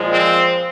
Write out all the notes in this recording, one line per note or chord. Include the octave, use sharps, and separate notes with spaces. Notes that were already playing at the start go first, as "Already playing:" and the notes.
Already playing: A#2 F3 G#3
C4